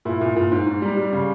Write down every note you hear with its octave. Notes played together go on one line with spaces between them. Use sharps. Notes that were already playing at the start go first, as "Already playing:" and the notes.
A#2 E4
A#2
A#2
G#2
G#2
G3
G3
C#3